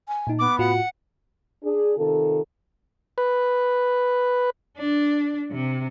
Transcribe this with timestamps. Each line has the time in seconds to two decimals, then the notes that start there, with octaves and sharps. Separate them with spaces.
0.08 G#5
0.27 A#2 D#4
0.39 B3 D6
0.59 A2 F4 F#4 F#5
1.63 D4 G#4
1.97 C3 D#3 F4 A4
3.18 B4
4.78 D4
5.52 C3